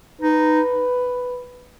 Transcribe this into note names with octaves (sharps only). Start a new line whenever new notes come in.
D#4 B4